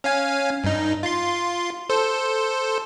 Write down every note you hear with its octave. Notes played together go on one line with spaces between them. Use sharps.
C#4 F5 G#5
G2 D#4
F4 C6
A4 C5